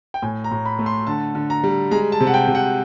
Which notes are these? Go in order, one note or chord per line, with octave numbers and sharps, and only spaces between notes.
G5
A2 G#5
A#5
A2
B5
A3
C6
D3 A5
D3
A#5
G3
G#3 A#5
A5
C3
F#5
G5
C3
F#5